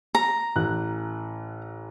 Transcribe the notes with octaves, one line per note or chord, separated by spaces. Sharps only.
A#5
A1 F#6